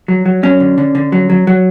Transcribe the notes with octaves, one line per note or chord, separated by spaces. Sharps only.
F#3
F#3
F#3 C#4
D3
D3
D3
F#3
F#3
F#3